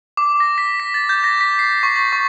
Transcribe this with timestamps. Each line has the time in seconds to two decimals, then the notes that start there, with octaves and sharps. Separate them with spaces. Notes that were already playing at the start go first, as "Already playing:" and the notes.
0.17 D6
0.40 A#6
0.58 B6
0.80 B6
0.94 A6
1.09 G6
1.24 A#6
1.41 B6
1.59 C7
1.83 C#6
1.96 A6
2.13 C#6